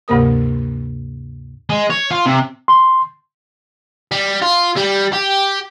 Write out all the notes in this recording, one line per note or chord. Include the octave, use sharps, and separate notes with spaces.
D2 G2 C3 A#3 A#4 D#6
G#3
C#5
F4
C3
C6
G3
F4
G3
G4